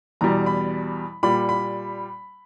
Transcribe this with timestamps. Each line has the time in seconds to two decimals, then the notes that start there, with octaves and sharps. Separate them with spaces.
0.21 E2 B2 G3 A#5
0.46 B5
1.23 A#2 G3 B5
1.49 B5